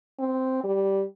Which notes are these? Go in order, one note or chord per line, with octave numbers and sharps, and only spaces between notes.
C4
G3